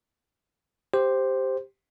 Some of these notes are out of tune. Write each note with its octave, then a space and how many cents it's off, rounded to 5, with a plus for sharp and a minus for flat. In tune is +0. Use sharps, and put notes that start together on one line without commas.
G4 +0 C5 +0